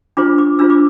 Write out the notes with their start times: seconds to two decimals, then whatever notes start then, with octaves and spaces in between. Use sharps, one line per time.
0.17 D4 F4 C5 D6
0.38 D6
0.59 D4 F4 C5 E6
0.70 D6